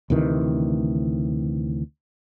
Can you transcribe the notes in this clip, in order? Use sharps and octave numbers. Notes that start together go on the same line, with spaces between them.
D2 C3 D#3 E3